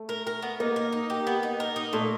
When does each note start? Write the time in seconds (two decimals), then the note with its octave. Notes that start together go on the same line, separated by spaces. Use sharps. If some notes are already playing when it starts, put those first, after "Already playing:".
Already playing: A3
0.09 A#4
0.27 A#4
0.42 B3
0.60 A#3 D#4
0.76 A#4
0.93 D#4
1.10 G4
1.27 B3
1.43 D#4
1.60 A#4
1.76 D#4
1.93 A#2 A3